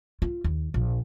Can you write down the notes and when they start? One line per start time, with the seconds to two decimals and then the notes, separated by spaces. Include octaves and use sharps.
0.22 F4
0.44 D#2
0.74 A#1